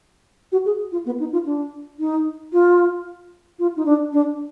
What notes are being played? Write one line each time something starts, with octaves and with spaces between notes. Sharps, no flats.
F#4
G#4
F4
B3
D#4
F4
D4
D#4
F4
F4
D#4
D4
D4